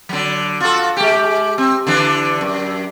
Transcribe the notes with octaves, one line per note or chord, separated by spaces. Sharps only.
D3 F#3
F4 F#4 A4
G#3 G4
C4
D3 E3 D4
F#2